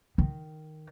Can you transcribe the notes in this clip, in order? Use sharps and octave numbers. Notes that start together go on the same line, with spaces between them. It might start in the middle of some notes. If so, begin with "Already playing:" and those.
D#3